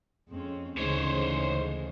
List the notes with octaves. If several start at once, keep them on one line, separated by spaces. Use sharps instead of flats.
F2 G#3 C4 C#4
D2 G#2 C#3 E3 G#3 C#4 C5 C#5